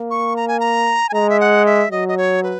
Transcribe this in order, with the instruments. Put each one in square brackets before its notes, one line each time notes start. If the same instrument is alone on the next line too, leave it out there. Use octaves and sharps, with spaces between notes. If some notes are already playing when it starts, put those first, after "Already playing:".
Already playing: [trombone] A#3
[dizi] C#6
A#5
G#5
A#5
G#5
[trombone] G#3 [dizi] A#5
[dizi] E5
F#5
E5
[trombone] F#3 [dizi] D#5
[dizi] D#5
C#5
B4